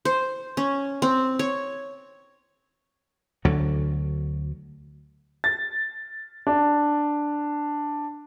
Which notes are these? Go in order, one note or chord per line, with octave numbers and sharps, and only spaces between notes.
C5
C#4
C4
C#5
D2 D3 F#3
A6
D4